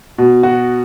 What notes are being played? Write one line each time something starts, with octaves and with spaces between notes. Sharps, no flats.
B2
F#4